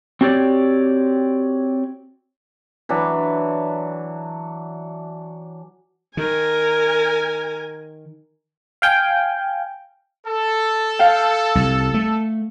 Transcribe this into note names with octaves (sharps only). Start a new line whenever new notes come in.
C4 F#4 G4 C#5 D5
E3 F#3 D4
D#3 A#4 G#5
F5 G5 G#5 G6
A4
F5 G5
C2
A3